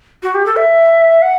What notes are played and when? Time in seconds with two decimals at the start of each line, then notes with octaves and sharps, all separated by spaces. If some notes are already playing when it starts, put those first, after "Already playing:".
0.23 F#4
0.34 G4
0.46 A4
0.56 E5
1.22 F#5